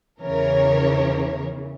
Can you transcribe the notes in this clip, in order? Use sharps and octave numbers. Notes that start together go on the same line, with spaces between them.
E2 C#3 E3 A#4 C#5